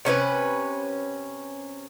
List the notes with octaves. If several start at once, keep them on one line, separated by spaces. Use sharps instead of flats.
C3 C#4 D#4 B4